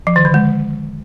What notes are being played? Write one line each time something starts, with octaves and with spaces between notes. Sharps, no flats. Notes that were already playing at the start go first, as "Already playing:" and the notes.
F3
D#3
D3
G#3